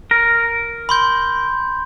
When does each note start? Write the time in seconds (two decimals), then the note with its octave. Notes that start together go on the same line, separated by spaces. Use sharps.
0.11 A#4
0.89 B5 C6 G6